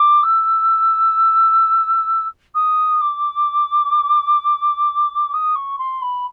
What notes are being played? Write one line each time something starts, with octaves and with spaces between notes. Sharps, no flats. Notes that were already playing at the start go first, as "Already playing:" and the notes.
Already playing: D6
E6
D#6
D6
D#6
C#6
C6
B5